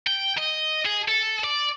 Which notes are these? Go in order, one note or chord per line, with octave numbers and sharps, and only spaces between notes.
G5
D#5
G#4
A4
D5